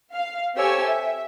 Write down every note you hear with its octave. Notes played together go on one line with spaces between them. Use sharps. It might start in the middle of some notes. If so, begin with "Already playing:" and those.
F5
C4 G4 A4 C#5 G#5 E6
E5